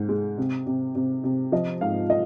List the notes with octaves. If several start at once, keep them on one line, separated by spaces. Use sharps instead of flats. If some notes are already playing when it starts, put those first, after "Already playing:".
Already playing: G#2
G#3
C3
C3
C3
C3
F3 D#5
G#2 F5
D#5